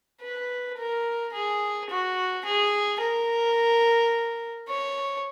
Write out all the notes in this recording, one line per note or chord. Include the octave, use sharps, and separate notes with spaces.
B4
A#4
G#4
F#4
G#4
A#4
C#5